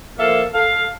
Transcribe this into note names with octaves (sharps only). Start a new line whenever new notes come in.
F3 A#3 A4 E5 F5
A4 F5